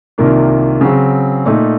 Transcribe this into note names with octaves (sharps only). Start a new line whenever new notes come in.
C2 C3 D#3 A#3 F4
C#3 F#3 C4
A#2 A3 D#4